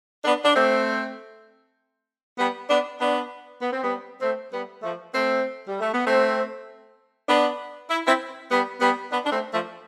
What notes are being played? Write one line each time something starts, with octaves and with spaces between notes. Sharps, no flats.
B3 D4
D4
A3 C4
G3 B3
B3 D4
B3 D4
B3
C4
G3 B3
A3 C4
G3 B3
F3 A3
A3 C4
G3
A3
B3
A3 C4
B3 D4
E4
C4 E4
G3 B3
G3 B3
B3 D4
D4
A3 C4
F3 A3